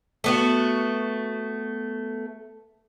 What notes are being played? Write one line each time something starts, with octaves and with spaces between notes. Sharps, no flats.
A3 B3 F#4